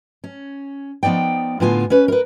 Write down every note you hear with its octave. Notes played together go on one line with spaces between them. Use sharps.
C#4
F3 B3 D#4 D5 G5
A2 D3 B3 F4 G#5
C#4 B4
A#4 B4